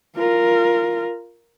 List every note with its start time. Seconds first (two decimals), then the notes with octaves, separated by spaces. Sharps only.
0.16 F4 A#4